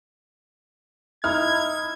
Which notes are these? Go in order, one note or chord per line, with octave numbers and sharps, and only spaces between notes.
D#4 E4 F6 G#6